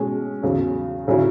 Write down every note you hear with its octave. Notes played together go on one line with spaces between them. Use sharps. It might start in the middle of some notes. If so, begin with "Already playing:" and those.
Already playing: B2 G#3 C#4 G#4
E2 C#3 F#3
C#3 F#3 C#4 E4